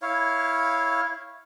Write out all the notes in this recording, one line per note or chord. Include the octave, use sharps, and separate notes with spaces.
E4 C#5 F5